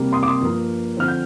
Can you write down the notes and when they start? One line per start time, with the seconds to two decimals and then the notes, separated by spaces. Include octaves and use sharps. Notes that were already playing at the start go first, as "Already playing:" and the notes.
Already playing: C3 G3 A#3
0.13 C6 D#6
0.23 D6
0.27 C6 D#6
0.41 G2 F3 A#3
0.97 D3 F3 C4 F6
1.08 G6